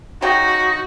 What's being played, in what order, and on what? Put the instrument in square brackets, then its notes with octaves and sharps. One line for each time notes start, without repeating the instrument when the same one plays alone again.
[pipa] C#3 G5 [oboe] D#4 [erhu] F#4